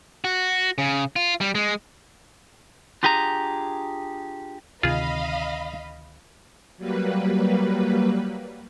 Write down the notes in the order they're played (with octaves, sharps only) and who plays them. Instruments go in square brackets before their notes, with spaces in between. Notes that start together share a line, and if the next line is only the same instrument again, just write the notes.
[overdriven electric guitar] F#4
C#3
F4
G3
G#3
[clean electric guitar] D4 F4 G4 G#4 G#5 A#5
[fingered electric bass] D2 C3 D#3 [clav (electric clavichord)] F4 G#4 [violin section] D#5 F5 B5
[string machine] F#3 G3 A#3 B4